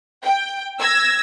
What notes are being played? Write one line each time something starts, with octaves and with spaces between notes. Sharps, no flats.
G5
E6 G#6 A#6